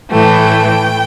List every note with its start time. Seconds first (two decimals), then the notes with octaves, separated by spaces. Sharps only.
0.11 A2 E3 A3 G5